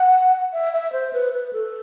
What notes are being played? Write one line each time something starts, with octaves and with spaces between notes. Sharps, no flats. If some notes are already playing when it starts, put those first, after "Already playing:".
Already playing: F#5
E5
E5
C5
B4
B4
A4